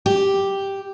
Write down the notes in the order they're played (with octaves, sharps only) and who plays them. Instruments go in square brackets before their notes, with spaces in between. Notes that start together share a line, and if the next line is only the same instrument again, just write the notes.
[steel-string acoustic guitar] G4